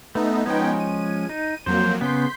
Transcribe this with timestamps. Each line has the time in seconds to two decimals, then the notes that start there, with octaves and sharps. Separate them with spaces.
0.15 A3 B3 D#4
0.46 F3 G#3 B3 C#4 D#4 G5
0.80 D#7
1.29 D#4
1.66 F2 F#3 A#3 C5
2.01 C#3 B3 C6 G6 B6